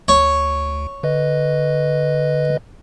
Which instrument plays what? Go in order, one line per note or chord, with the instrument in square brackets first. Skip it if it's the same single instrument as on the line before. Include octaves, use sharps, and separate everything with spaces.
[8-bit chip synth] D2 [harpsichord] C#5
[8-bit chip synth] D3 B4 D#5